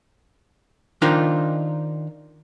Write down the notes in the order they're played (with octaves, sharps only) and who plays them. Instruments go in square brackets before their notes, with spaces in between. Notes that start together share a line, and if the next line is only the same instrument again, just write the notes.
[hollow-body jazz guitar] D#3 D4 D#4 F4 A#4 C5